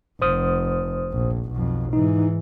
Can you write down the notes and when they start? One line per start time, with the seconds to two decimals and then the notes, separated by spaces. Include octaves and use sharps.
0.22 F1 C5 D#6 F6
1.12 A#1
1.52 B1 F2
1.93 G#2 E3 D#4